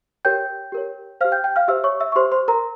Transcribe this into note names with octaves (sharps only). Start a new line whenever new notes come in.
G4 A#4 C#5 G5 G6
G4 A#4 C#5
G4 C5 F5 F6
G5 G6
G5 G6
F5 F6
G4 C5 E5 E6
C#5 C#6
E5 E6
C#6
G4 C5 C6
C5 C6
A#4 A#5